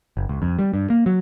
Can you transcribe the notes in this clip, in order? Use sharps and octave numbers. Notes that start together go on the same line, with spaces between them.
F#1
C#2
F2
G3
G2
A#3
F#3